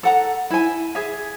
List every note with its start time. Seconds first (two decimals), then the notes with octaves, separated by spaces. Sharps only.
0.03 A4 F#5 A#5
0.51 E4 G#5
0.95 G#4 E5